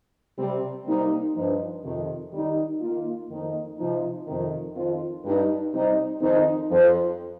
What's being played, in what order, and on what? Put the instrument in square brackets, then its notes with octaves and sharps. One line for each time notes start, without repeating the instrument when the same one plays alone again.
[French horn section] C3 G3 C4
C3 G3 A#3 D#4
G2 F3 D#4
F2 C3 D#3
D#3 G3 D#4
D#3 A#3 F4
F2 D#3 A#3 D#4
C3 F3 D#4
F2 C3 D#3
F2 D#3 C4 F4
G2 G3 D#4
C3 G3 C4 D#4
F2 D#3 C4 D#4
F2 F3 C4